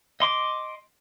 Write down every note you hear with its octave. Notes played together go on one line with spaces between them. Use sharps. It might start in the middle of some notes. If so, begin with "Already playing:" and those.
D#5 C6 D6